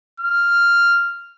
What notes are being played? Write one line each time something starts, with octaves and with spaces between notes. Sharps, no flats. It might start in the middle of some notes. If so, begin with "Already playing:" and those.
F6